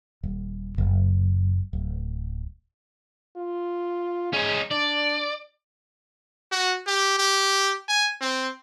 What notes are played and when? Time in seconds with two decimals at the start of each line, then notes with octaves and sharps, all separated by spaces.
0.23 D#1
0.78 F#1
1.73 D1
3.36 F4
4.33 G#3 C#4 D#4
4.71 D4 D5
6.52 F#4
6.87 G4
7.18 G4
7.89 G#5
8.21 C4